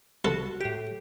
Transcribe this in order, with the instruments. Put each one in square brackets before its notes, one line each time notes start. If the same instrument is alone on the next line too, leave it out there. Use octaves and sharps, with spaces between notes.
[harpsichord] C2 A4 [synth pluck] F#4
[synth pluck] A2 G4